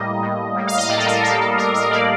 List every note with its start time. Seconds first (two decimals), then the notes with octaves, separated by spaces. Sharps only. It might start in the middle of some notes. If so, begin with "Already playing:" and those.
Already playing: A2 G3 A#3 D#5
0.21 A2
0.55 G3 A#3
0.67 F5
0.78 D#5
0.88 A2 D5
0.98 A4
1.06 A#4
1.22 A#3 A4
1.27 G3
1.40 A4
1.57 A2 A#4
1.74 A#4
1.91 G3 A#3 D5